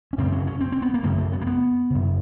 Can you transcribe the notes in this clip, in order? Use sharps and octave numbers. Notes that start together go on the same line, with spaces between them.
C#4
F#2 C#3 C4
C#4
C#4
C4
C4
B3
A#3
F#2 C#3 A3
A3
B3
A#3
B3
F#2 C#3